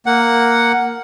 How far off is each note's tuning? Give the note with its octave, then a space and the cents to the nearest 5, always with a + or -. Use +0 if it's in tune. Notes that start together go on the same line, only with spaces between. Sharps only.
A#3 +0 F#5 +0